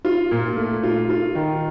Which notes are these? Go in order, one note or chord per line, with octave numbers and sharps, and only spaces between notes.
F4
A#2
A3
F4
F4
D#3